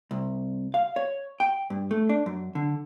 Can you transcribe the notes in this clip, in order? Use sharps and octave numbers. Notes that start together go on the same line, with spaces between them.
C2
F5
C#5
G5
G2
A3
D4
F#2
D3